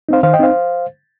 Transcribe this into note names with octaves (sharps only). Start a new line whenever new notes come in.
C4 D#4 C5 F5
D#3 C5 F5
D#5 G5
C4 D#4 C5 F5